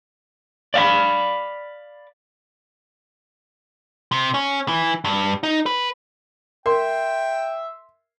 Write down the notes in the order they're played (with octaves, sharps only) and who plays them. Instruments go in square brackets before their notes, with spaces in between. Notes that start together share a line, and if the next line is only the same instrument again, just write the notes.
[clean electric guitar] D5 F5 F#5 B5
[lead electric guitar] C3
C#4
E3
G2
D#4
B4
[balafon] A#4 [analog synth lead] E5 [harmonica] G5 [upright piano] C6